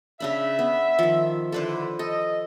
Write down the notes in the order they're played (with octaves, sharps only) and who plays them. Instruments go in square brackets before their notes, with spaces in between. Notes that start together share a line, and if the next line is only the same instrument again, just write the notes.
[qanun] C#3 D4 B5 [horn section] E5
[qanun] B3
D#3 F3
[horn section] D3 E4 D5 [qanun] A4 B4 C5
[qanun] A4 [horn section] D#5